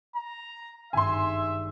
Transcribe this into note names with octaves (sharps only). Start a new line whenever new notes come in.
A#5
G#1 G2 E5 G#5 C6